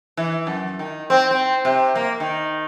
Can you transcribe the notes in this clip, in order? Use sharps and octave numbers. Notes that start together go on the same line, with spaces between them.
E3
F#2
D#3
C4
C4
C3
A#3
D#3